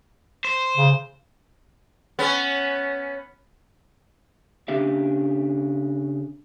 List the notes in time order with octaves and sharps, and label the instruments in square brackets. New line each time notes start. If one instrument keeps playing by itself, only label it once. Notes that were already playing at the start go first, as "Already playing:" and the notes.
[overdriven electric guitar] C5
[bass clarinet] C#3
[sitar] B3 C#4
[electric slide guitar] C#3 D4 G4 E5